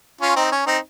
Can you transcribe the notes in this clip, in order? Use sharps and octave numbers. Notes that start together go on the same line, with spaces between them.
C#4 F4
C4 D#4
C#4
C4 D#4